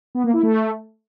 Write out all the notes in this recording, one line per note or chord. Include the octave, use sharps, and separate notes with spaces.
B3
A#3
E4
A3